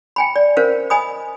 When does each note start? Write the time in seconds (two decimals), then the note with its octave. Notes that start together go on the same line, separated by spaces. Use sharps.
0.16 G5 G#5 B5
0.36 D5
0.57 C#4 A#4 C5 F5
0.90 D#5 G#5 B5 D#6